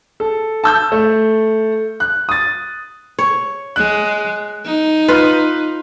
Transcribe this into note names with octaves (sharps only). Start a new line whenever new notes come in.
A4
A5 E6 G6
A3
F#6
D#6 A6
C#5
G#3 F#6
D#4
F4 B4